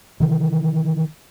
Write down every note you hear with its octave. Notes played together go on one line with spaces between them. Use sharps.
C3 D#3 E3